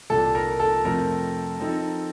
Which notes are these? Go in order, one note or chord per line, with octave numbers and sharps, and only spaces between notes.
C2 A#2 G3 A4
A#4
A4
F2 C3 F3 A3 C4 A#4
F3 C4 D#4 A4